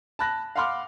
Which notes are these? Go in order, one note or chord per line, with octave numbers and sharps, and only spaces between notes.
A5 B5 F#6 A#6
F5 F#5 B5 C6 D6 F6